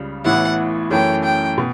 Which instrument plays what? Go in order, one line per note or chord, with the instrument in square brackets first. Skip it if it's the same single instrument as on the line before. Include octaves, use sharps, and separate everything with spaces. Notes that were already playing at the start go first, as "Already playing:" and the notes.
Already playing: [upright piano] C#2 C#3 G3
[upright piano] A1 A2 E3 B3 E4 [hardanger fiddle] F#5
[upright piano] F#2 E3 A3 C#4 [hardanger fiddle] G5
[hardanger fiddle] G5
[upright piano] B2